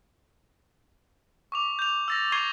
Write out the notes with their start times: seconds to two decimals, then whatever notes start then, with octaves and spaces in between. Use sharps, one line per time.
1.52 C#6 D6 F7
1.79 G6 F7
2.08 E6 A6 A#6
2.32 C#6 G#6 C7 D#7 F7 G7